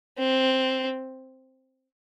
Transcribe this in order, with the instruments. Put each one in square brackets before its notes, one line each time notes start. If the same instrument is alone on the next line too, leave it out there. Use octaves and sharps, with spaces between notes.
[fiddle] C4